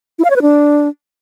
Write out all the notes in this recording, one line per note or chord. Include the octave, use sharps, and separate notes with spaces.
E4
F5
C#5
B4
D4